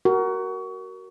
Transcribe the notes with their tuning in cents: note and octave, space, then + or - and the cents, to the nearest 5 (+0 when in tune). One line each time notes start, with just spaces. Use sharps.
F#4 +25 A#4 +0